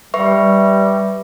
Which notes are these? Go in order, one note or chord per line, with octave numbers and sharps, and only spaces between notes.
G3 B4 E5 C#6